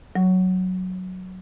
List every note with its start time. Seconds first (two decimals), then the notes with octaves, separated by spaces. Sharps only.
0.16 F#3